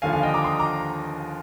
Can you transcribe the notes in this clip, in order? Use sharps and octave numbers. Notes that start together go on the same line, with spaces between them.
D#2 D3 F3 F5 G#5
F5 G#5
D#5 G5
D#6
A#5 D6
C6 D#6
A#5 D6